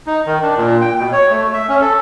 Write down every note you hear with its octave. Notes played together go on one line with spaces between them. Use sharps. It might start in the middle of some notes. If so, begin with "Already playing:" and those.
D#4
D#3
D4
A#2
G5
B2
C#5
A3
E5
C#4
A4